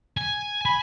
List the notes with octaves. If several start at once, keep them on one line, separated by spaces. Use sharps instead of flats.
G#5
G#5 B5